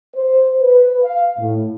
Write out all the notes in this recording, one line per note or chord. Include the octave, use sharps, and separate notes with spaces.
C5
B4
F5
A2